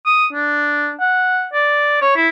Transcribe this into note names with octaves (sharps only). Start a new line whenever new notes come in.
D#6
D4
F#5
D5
C#5
E4